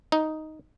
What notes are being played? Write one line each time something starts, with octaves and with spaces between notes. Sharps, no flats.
D#4